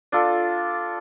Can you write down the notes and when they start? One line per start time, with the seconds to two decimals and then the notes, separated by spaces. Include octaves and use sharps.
0.12 D4 F4 A4